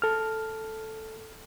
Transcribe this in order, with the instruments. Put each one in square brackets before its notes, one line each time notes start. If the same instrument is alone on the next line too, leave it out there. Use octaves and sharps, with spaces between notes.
[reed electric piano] A4 F6